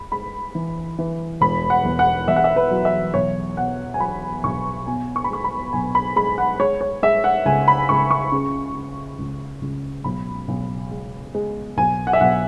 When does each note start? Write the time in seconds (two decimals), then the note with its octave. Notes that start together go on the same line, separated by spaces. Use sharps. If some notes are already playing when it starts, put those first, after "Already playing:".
Already playing: G#3 B5
0.12 G#3 B5
0.55 E3
0.99 E3
1.41 E1 B5
1.70 F#5
1.85 E2
1.99 F#5
2.28 E2 E5
2.36 F#5
2.44 E5
2.56 B4
2.71 F#3
2.85 E5
3.14 B1 C#5
3.57 B2 F#5
3.94 G#5
4.00 F#3 B5
4.44 B1 C#6
4.87 B2 G#5
5.16 C#6
5.24 B5
5.30 G#3 C#6
5.44 B5
5.73 B1 G#5
5.95 B5
6.16 G#3 B5
6.38 F#5
6.59 G#3 C#5
6.81 C#5
7.02 G#3 E5
7.24 F#5
7.45 C#2 G#5
7.68 B5
7.89 C#2 C#6
8.11 C#6
8.32 C#3
8.75 C#3
9.19 C#2
9.62 C#2
10.04 B1 B5
10.48 B1
10.91 G#3
11.35 G#3
11.77 B1 G#5
12.07 F#5
12.13 E5
12.21 B1 F#5